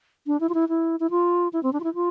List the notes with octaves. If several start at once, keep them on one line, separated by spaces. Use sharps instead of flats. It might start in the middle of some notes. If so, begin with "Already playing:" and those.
D4
E4
F4
E4
E4
E4
F4
E4
C4
D4
F4
E4
F4